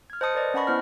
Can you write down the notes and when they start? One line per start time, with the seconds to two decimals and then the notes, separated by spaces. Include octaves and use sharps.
0.10 F6 G#6
0.21 C5 D#5 A5 D#6 C#7
0.34 A#4 B4 D5 D#5
0.54 C#4 F#5 A5 B5 C#6 A#6
0.67 B3 E4 C5 D#5 F6